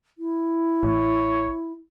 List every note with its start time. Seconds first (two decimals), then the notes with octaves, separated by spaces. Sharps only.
0.18 E4
0.83 A1 C#5